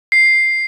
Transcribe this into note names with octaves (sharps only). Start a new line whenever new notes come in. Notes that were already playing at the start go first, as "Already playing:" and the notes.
C7